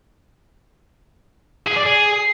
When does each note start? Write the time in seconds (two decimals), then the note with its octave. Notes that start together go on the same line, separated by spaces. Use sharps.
1.67 G#4
1.76 D5
1.85 G#4